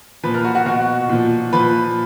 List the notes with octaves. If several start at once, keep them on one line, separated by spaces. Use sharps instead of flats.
A#2 F3 B4 B5
A#4 A#5
F#4 F#5
F#4 F#5
B2 F#4 F#5
A#2 F3
A#2 F3 B4 B5